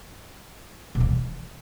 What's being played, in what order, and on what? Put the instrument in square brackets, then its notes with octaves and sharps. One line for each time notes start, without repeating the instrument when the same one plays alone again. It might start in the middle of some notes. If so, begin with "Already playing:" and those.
[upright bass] B2
D#3
E3